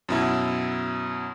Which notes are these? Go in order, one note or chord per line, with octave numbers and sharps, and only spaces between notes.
F#2 B2 E4